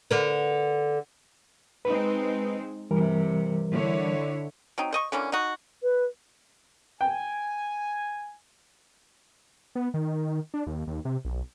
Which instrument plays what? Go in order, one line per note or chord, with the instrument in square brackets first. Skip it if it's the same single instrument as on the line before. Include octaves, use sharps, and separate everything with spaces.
[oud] D3 A#4 B4
[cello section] G#3 C4 D#4 [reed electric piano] B4
[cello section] G2 C3 [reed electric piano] E3 G3 A#4
[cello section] D3 E4 C#5
[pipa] F#3 C4 D#4
C5 D#5 C#6
D3 E3 A#3 C#4
D#4 F#4
[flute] B4
[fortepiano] G5 [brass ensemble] G#5
[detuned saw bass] B3
D#3
D4
D#2
D#2
C3
B1